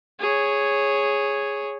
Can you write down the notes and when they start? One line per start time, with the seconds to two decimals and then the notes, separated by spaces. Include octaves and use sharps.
0.20 G#4 C#5